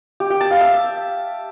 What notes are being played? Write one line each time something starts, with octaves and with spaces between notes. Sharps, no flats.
G4
G5
A5
F5
E5